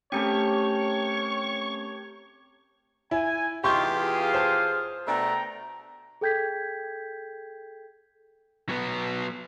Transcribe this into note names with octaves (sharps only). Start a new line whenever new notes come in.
A3 C4 C#4 G4 A#4 C#5 A5 C#6
E4 G#5
E2 E3 D#4 F4 G4 C6 C#6 G6
F4 G#4 F5
C5 A5
B2 A3 D4 G5 A#5
G#4 A4 G5 G6 G#6 B6
F#3 B3